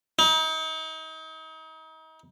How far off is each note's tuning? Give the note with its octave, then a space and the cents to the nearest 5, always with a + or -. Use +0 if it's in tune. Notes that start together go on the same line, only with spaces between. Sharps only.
D#4 +35